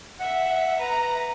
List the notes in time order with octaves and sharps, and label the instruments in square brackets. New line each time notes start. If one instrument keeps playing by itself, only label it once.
[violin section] E5 [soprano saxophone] F#5
[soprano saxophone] B4 [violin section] A#5